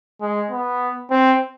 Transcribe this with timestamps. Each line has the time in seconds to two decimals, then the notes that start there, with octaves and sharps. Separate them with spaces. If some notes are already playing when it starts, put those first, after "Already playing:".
0.21 G#3
0.51 B3
1.11 C4